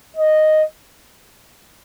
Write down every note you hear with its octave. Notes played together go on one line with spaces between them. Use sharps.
D#5